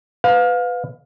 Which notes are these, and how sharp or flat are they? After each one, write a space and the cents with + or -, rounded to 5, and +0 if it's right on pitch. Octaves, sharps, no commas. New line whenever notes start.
B4 +20 F5 +25